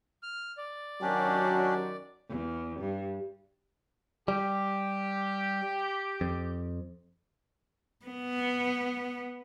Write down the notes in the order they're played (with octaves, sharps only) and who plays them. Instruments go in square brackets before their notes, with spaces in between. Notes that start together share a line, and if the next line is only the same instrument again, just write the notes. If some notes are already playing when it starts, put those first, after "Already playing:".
[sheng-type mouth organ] F6
D5
[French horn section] F#2 D#3 F#3 [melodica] C#4 D4 G4
[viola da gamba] E2
G2
[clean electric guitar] G3 [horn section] G4
[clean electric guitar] F2
[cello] B3